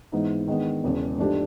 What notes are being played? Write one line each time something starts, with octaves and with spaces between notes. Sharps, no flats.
G#2 E3 G#3 B3 D#4
D#3 G#3 B3 D4
E1 E2 C#3
G#2 F3 A3 D4 G4